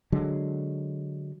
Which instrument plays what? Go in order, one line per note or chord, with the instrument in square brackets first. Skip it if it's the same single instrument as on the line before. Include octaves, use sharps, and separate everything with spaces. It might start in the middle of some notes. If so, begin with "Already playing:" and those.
[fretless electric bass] D3 F#3 G#3